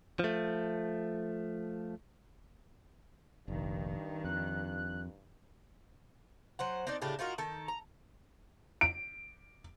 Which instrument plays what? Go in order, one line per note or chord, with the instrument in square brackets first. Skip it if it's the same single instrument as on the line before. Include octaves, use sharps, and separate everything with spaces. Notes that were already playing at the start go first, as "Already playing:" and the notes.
[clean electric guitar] F3 A3
[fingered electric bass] F1 A#1 [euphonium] G2 [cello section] D#3
[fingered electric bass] F2 [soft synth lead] F#6
[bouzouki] F#3 C5 F#5
C4 D4 D#4 D5
A2 C#3 D4 G4
D#4 F4 F#4 A#4
D#3 A4
A#5
[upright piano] D7